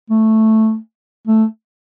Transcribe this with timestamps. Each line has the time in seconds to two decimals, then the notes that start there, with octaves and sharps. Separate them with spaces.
0.10 A3
1.28 A3